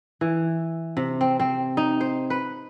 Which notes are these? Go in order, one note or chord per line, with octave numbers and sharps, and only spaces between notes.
E3
C3
C4
C4
D#4
C5
B4